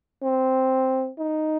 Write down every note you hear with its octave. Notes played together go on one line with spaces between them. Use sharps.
C4
D#4